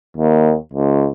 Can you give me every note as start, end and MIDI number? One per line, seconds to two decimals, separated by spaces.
0.17 0.54 39
0.74 1.09 37